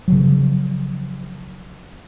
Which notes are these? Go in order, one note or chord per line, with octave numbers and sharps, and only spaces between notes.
C#3 F3 F#3